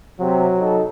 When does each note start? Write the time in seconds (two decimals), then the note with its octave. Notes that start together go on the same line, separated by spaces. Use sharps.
0.19 C3 F#3
0.60 D#4 F#4 A4